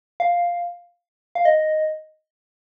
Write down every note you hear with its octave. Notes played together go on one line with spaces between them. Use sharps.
F5
F5
D#5